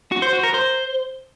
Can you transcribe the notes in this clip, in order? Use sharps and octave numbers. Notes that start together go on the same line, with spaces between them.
F#4
C5
F#4
A#4
C5